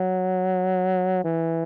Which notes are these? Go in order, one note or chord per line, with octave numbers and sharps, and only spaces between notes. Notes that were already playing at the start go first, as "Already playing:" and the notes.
Already playing: F#3
E3